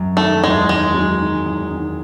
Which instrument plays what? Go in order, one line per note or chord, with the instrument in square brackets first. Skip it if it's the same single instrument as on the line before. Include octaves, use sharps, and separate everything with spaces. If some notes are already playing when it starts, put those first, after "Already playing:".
Already playing: [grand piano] F#2
[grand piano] D#3 [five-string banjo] A3
[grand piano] E2 [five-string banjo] G#3
[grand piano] D#3 [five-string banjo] G#3
[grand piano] F#3
D#3
E2
D#3